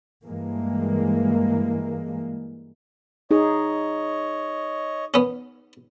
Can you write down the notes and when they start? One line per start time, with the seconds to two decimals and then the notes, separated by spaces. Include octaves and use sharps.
0.25 G2 E3 G#3 A#3
3.31 D#4 G#4 C#5 D#5
5.14 B3 C#4